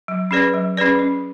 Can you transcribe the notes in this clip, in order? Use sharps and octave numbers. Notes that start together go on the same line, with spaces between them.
F#3
C#4 G#4 B4 D5
F#3
C#4 G#4 B4 D5
C#4